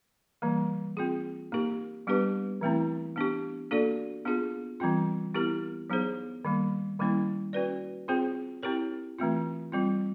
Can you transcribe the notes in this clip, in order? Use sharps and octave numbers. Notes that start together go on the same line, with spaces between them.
E3 G3 A#3
C4 F4 G#4
A#3 D#4 G4 A#4
G3 B3 D4 G4 B4
E3 A3 C4 E4
B3 D4 G4
A#3 D4 F#4 A4 D5
B3 D4 F4 G#4
E3 G3 C4 F4
B3 E4 G4 A#4
F#3 B3 D#4 G#4 C5
D#3 G3 A#3
D#3 G3 A#3 C#4 E4
C#4 F#4 B4 D5
C4 F4 G#4 C5
C4 E4 G4 A#4 C#5
E3 A3 C4 F4
G3 C4 F4